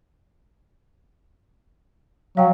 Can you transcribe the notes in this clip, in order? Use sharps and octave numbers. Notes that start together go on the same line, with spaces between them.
F#3 F5 G5